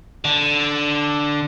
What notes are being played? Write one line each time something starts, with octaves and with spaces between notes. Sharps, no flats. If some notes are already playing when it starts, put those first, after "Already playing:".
D3